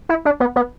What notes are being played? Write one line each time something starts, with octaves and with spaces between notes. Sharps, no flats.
E4
D4
B3
B3